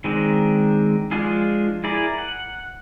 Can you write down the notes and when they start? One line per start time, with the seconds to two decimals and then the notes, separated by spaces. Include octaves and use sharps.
0.04 D#3 G#3 C4 D4 A#4
1.11 F3 G#3 D4 F4 G#4
1.84 E4 G#4 A#4 D5
2.18 F#5